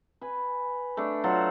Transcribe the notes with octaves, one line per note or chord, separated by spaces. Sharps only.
B4 G#5
A3 D4
F#3 F4 F#5 A5